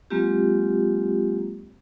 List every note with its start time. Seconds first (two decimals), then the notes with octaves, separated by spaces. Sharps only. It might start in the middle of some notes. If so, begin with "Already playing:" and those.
0.10 F#3 G#3 A#3 C4 F4 G4